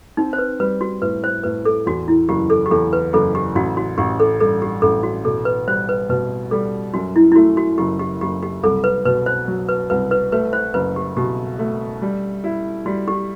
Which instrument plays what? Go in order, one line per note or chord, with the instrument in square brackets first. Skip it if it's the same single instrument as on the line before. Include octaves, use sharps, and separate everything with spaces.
[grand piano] C4 [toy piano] D#4
[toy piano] C5
B4
[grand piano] G3 [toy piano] B4
[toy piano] F#4
[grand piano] A2 [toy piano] B4
[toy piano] C5
[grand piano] A2 [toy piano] B4
[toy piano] A4
[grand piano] E2 [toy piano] F#4
[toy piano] E4
[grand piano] F#1 [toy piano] G4
[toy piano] A4
G4
[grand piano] E2 [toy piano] A4
[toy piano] B4
[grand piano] F#1 [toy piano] A4
[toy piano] G4
[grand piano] A1 [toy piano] F#4
[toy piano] F#4
[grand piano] A1 [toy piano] G4
[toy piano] A4
[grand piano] G2 [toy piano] A4
[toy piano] G4
[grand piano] A1 [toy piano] A4
[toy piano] F#4
[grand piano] B2 [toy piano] A4
[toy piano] B4
[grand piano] G3 [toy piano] C5
[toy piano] B4
[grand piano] B2 [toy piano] B4
[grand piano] G3 [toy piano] A4
[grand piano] F#2 [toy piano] F#4
[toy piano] E4
E4
[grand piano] A3 [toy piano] F#4
[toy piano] F#4
[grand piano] F#1 [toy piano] G4
[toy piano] G4
[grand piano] F#1 [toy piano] G4
[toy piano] G4
[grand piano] C2 [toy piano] A4
[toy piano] B4
[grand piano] B2 [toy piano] B4
[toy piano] C5
[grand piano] F#3
[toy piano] B4
[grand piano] C2 [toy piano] B4
[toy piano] B4
[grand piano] A3 [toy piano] B4
[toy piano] C5
[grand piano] F#1 [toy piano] B4
[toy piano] G4
[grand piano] B2 [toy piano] G4
[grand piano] A3
G3
E4
[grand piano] G3 [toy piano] F#4
[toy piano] G4